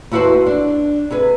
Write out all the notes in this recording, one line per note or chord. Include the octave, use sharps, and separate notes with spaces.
D#2 E4 F#4 B4 C5 A5
D4
C3 G#4 B4